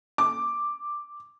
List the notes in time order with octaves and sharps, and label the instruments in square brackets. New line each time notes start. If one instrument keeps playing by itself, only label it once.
[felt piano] D6